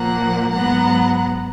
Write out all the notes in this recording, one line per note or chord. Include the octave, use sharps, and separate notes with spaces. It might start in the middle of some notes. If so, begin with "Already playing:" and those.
Already playing: A#2 F3 A#3 F#5 A#5
G#2 F#3 B3 F#5 A#5